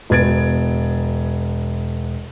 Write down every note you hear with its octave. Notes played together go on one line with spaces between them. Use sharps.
E1 B4 G#6 A6 D7